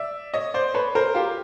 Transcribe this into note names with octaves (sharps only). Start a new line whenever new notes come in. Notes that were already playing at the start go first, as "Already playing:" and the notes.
Already playing: D5 E5
C#5 D#5
C5 D5
B4 C#5
A#4 C5
F4 G4